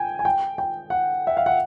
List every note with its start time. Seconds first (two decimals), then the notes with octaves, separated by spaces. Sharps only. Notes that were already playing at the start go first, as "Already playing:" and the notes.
Already playing: G5 G#5
0.19 G#5
0.25 G5
0.58 G5
0.90 F#5
1.27 E5
1.37 F5
1.46 F#5